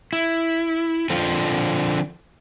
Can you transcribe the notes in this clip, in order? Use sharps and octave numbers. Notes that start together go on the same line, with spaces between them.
E4
D3 F3 C4 F4